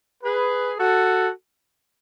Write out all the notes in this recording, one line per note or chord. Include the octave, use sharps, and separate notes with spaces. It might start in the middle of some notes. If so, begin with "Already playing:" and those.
G#4 B4
F#4 A4